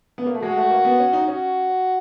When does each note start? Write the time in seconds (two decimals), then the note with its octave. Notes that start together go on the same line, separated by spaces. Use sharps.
0.18 B3
0.26 A#3
0.34 A3
0.42 G#3 F#4
0.57 A3
0.70 A#3
0.85 B3
0.99 C#4
1.13 D#4
1.27 C#4 F#4